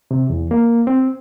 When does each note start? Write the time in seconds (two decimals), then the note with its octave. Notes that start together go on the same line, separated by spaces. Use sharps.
0.11 C3
0.30 E2
0.51 A#3
0.87 C4